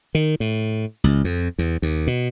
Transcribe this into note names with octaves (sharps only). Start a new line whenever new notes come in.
D#3
A2
C#2
F2
E2
D#2
B2